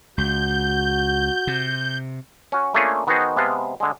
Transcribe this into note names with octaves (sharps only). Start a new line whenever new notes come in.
C#2 F#4 G6
C3
C#4 F#4
A3 A#3 C#4 D4 F4 G#4
D#3 B3 D#4 F#4 G#4 C5
C3 G#3 B3 B4 F5 A5
D3 G#3